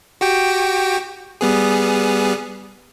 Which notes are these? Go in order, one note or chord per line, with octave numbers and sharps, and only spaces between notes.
F#4 G4 G5
G3 B3 G#4